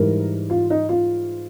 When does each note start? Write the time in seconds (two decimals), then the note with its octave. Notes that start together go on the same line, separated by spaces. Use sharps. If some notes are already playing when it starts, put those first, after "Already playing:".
Already playing: G#2 E3 G3 A#4
0.50 F4
0.70 D#4
0.89 F4